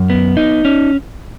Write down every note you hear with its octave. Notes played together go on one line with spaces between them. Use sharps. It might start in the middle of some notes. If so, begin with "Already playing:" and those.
Already playing: F#2
B3
D#4
C#4